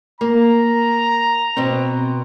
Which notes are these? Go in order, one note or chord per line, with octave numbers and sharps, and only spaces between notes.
A#3 A#5
B2 B3 C4